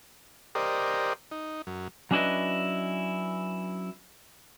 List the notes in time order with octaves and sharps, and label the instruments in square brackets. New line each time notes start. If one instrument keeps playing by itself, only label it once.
[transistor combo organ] G4 A#4 C5 D5 D#5
D#4
F#2
[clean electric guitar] F#3 C#4 D4 E4 B4 D#5